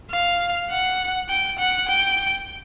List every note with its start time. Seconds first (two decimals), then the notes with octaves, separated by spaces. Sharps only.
0.11 F5
0.70 F#5
1.29 G5
1.59 F#5
1.89 G5